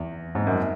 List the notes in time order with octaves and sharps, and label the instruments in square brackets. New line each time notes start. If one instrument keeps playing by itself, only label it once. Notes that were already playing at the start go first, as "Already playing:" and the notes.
Already playing: [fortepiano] E2
G#2
F#2